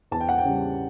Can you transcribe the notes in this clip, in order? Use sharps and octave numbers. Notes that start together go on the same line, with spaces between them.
E2 A5
G5
F#5
G5
C#3 G3